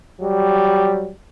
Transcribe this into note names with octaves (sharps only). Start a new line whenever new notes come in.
F#3 G3 G4